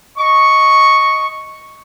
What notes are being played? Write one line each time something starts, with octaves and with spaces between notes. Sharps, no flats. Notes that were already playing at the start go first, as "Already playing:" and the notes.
D#5 C#6